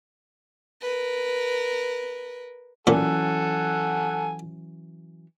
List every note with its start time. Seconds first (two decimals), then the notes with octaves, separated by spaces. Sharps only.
0.82 A#4 B4
2.87 A#2 E3 F#3 A#3 C#4 A4 F#5 G#5